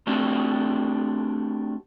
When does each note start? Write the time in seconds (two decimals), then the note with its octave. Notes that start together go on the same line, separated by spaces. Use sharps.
0.07 A3 C4 D4 F#4 G4